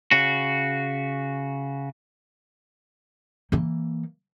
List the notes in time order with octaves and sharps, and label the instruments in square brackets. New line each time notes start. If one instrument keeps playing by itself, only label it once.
[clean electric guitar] C#3 F#4
[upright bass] E3 A#3